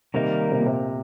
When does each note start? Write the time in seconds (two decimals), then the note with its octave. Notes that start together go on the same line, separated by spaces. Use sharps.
0.14 C3 D#3 G3 A#3 D#4 A#4
0.52 C3
0.59 A#2
0.66 C3